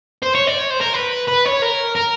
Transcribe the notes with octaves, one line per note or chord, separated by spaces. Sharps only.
C5
C#5
D5
C#5
C5
A#4
B4
B4
C#5
A#4
A#4